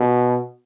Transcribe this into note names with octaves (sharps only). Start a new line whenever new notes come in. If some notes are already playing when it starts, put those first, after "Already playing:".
Already playing: B2